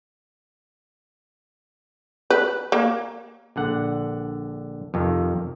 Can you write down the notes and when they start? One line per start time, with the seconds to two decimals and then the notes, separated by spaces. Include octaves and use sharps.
2.30 B4
2.72 A#3
3.56 A#1 D3 F#5
4.94 F2 C3 D#3